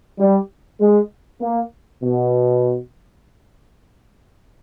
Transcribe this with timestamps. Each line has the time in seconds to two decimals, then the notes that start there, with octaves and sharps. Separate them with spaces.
0.19 G3
0.80 G#3
1.41 A#3
2.02 B2